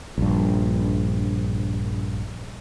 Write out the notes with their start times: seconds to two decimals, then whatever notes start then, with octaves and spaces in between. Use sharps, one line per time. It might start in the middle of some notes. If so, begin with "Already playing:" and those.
0.18 A#1 G2